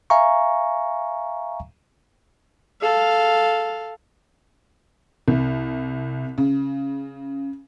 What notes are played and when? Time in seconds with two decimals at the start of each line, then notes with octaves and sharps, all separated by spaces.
0.10 E5 F5 G#5 A#5 C#6
2.81 A4 F5
5.28 C2
6.38 C#3